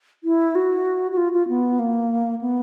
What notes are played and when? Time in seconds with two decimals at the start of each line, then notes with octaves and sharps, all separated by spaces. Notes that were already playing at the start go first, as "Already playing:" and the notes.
0.24 E4
0.55 F#4
1.12 F#4
1.17 F4
1.33 F4
1.48 B3
1.79 A#3
2.41 B3